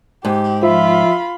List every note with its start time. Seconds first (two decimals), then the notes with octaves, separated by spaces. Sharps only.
0.25 G#2 G4
0.63 F3 F4 E5 B5